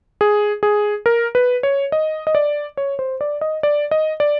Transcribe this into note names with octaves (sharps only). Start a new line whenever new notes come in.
G#4
G#4
A#4
B4
C#5
D#5
D#5
D5
C#5
C5
D5
D#5
D5
D#5
D5